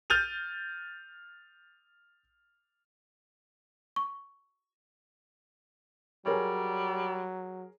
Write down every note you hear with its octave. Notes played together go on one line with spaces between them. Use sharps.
F6 G6 A6 D#7 F7
C#6
F#3 G3 G#4 A#4 C#5